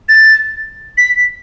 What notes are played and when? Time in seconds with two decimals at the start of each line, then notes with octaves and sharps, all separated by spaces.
0.09 A6
0.98 B6